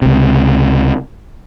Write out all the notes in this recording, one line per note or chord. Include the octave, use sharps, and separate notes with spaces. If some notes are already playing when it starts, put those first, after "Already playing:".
C#2 C3